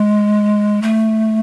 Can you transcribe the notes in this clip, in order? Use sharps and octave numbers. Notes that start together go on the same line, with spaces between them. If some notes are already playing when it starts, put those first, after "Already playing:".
Already playing: G#3
A3